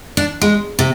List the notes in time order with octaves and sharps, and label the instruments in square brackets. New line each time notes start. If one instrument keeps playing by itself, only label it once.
[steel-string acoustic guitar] D4
G#3
C3